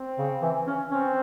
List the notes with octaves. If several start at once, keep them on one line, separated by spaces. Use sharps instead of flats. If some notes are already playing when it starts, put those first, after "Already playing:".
Already playing: C4
C#3
E3
C#4
C4 C#4